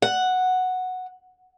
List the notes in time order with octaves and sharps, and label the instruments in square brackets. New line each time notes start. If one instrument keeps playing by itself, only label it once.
[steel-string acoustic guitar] F#5